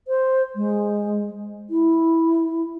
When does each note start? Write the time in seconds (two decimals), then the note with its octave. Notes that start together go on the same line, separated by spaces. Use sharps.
0.08 C5
0.56 G#3
1.70 E4